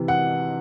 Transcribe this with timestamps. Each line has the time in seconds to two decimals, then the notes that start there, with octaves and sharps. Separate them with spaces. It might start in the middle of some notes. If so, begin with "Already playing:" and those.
Already playing: C3 E3
0.08 F#5